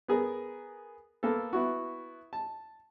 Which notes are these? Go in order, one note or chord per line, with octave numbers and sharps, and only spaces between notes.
B3 G#4 A#4
A#3 B3 A4
B3 E4 F#4
A5